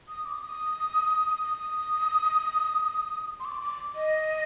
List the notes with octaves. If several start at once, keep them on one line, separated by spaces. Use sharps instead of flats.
D#6
D6
D#6
D#6
C6
D6
D6
D#5